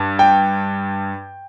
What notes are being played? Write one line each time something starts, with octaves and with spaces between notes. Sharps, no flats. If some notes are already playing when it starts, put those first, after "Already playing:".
Already playing: G2
G5